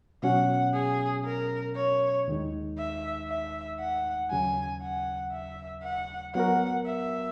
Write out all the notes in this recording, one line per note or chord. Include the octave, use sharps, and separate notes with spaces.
B2 F#3 C#4 F#4 F#5
G#4
A#4
C#5
D#2 D#3 G#3 D#4
E5
E5
F#5
D#2 C#3 F#3 G#5
F#5
E5
F#5
F#3 B3 F#4 A#4 F#5
E5